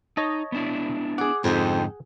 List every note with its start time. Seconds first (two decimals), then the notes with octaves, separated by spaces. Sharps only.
0.17 D#4 C#5 D#5 A5
0.52 B3 D4 E4
1.18 G#4 D5 F#5
1.44 F2 G#2 D3 D#4 G4 A4